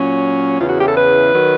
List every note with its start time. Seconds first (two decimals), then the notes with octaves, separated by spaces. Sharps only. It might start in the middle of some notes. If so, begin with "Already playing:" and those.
Already playing: A#2 F#3 C#4
0.60 E2 C#3 E3 F4
0.69 F#4
0.79 G4
0.87 A4
0.97 B4
1.34 D#3 F#3